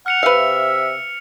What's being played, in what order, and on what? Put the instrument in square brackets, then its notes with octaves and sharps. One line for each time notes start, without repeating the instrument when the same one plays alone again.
[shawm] F#5 [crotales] F6 C#7 F7
[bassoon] C3 [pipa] B4 F5 [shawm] E5